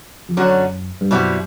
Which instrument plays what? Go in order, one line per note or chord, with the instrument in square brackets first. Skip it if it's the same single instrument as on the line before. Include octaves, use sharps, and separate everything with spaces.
[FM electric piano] F2
[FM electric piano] F#2 [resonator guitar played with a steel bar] D3 F#3 A3 C#4 F#4
[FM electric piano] G2
[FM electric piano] F#2 [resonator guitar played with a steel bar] B2 G3 C4 E4